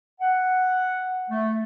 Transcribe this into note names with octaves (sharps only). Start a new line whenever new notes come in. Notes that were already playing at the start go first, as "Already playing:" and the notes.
F#5
A3